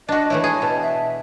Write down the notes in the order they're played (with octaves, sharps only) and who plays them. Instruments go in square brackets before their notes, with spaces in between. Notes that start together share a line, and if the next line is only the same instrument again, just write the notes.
[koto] D4 F#4 [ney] D#5
[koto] E3 A3 E4 [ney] C#5
[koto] G#4
[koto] B2 [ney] A5
[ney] E5